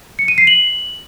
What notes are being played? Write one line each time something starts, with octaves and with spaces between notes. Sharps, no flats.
C#7
D#7
C7
F#7